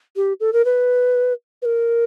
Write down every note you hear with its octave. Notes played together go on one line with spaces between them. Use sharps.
G4
A4
A#4
B4
B4
A#4